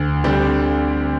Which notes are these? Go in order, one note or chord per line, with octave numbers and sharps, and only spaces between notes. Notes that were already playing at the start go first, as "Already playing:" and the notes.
Already playing: D2
D3 G3 C4 G4